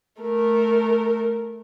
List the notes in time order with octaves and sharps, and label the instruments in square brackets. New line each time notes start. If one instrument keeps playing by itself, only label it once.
[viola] A3 A#4